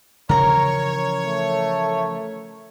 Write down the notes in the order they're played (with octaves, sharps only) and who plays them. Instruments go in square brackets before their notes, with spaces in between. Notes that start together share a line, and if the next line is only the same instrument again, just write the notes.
[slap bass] C#3 E3 F3 [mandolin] A#4 A#5 [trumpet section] C#5
[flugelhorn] A3